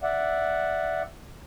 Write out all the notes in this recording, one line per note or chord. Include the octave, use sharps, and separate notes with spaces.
D5 E5 F#5